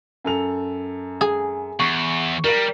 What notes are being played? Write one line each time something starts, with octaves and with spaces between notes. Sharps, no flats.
F#2 A4 F7
G#4
E2 C#6
G3 A#4 A#6